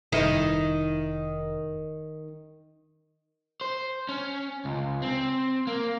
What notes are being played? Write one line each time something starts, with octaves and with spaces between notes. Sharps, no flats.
F1 D#3 E4
C5
C#4
C#2
C4
A#3